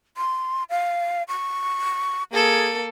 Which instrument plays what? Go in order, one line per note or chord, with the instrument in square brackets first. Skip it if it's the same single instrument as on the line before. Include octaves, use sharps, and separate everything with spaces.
[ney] C6
F5
C#6
[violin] A#3 A4 [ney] G#4